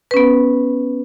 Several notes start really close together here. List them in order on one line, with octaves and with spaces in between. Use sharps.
B4 C#4 B3